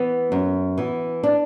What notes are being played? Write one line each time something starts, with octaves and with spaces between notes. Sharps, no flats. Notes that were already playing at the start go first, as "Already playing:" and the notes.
Already playing: E3 B3
F#2
E3 B3
D4